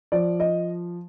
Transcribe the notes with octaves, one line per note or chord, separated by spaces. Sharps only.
F3 D5
D#5